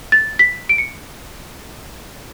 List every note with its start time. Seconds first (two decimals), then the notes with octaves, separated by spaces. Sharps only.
0.12 A6
0.39 B6
0.69 D7
0.78 C#7